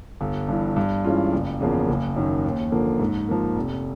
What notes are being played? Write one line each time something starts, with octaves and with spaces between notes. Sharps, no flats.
G1
G2 E3
G2
E3 G#3 C#4 F4
F#1
E2 C#3 F3 A#3
F#1
F#2 D#3
D#2
D3 F3 A#3
G#2
F3 A#3
F1